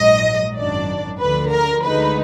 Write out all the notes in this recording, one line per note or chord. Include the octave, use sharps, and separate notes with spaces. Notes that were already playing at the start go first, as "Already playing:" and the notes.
Already playing: A#1 G#2 F#3 D#5
G#1 F#2 D#3 F#3 D4 D5
D2 D3 F3 B4
A#4
D2 D3 G#3 D#4 B4